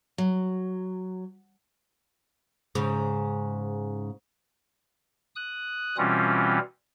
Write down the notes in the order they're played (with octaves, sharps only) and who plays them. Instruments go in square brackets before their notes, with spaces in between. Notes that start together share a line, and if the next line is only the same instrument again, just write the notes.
[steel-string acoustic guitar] F#3
[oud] G#2 C#3
[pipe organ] D#6 F#6
B2 E3 G3 C4 C#4 F4